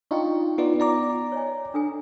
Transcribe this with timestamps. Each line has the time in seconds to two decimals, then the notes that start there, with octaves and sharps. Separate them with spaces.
0.11 D4 D#4 F4 G5 C#6
0.58 B3 D#4 F4 D5
0.80 D5 A#5 D6
1.32 C#5 D#5 G#5
1.74 D4 A4 G#5